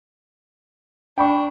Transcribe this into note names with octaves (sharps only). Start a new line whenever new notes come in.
D4 G5 B5 C#6